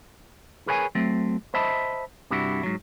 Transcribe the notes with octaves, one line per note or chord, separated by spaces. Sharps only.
G#4 A#4 B4 C#5 G5 G#5
F#3 A3 C4
C5 D#5 E5 A5 B5
G2 C3 G3 D4 E4 F#4
G#2 F#3